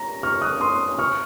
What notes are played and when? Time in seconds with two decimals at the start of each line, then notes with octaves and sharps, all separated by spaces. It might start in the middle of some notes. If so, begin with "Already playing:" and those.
Already playing: A#5
0.23 C#6 F6
0.42 D#6 F#6
0.61 C6 D#6
0.99 C#6 F6